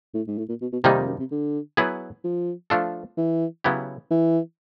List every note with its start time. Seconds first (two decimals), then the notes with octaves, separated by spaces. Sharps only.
0.14 A2
0.27 G#2
0.38 A2
0.49 A#2
0.61 B2
0.73 B2
0.84 A2 C3 D#3 G3 A#3 D#4
0.96 F2
1.07 F#2
1.19 C3
1.31 D3
1.77 F#3 B3 E4 G#4 B4
2.24 F3
2.70 F3 A3 D4 F4 A4
3.17 E3
3.64 C#3 F#3 B3 E4 G4
4.11 E3